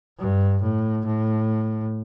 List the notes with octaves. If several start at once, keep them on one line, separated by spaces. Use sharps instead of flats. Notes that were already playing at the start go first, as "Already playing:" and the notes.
G2
A2
A2